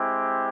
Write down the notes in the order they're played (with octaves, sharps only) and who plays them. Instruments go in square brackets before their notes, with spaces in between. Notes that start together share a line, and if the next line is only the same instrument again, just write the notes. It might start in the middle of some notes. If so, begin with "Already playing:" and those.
Already playing: [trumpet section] G#3 C4 E4 G4